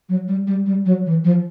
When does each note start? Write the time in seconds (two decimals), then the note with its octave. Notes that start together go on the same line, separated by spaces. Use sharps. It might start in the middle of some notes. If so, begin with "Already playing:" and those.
0.09 F#3
0.28 G3
0.47 G3
0.66 G3
0.86 F#3
1.06 E3
1.24 F3